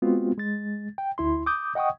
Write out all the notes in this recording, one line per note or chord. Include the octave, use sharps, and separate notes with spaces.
G#3 B3 C4 F4 F#4
G#3 A6
G5
D2 E4 C6
D6 D#6 G6
D#5 F#5 G5 C#6 D#6